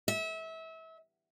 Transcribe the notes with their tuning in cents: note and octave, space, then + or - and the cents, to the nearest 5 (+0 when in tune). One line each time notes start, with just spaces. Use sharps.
E5 -30